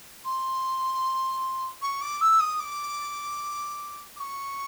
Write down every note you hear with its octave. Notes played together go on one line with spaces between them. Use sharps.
C6
C#6
D6
E6
D#6
D6
D6
C#6